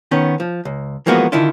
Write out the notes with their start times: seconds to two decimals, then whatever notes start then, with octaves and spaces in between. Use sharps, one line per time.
0.11 D#3 B3 C#4
0.40 F3
0.65 C#2
1.06 E3 F3 G#3 A#3 B3 F#4
1.32 D3 D#3 E4 F4